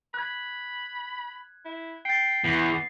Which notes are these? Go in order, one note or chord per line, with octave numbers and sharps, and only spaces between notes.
B5 F#6 G#6
E4
G5 A6 C7
E2 B3